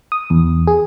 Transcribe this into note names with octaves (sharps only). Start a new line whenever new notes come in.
D#6
E2
G#4